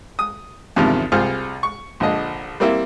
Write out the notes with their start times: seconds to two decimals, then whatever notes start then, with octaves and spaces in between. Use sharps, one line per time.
0.19 D#6
0.76 E2 G2 C3 D#3 F3
1.12 C2 F4 G#4 C5 F6
1.63 C#6
2.00 A#1 D3 F3 D#5
2.60 G3 A#3 C4 E4